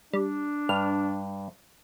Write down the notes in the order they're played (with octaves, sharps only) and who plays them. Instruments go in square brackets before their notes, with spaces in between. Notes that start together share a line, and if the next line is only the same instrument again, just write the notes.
[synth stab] G3 [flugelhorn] D4
[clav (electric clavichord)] G2 [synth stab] F6